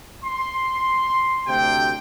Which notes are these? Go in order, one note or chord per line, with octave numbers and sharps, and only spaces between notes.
C6
D2 C3 G5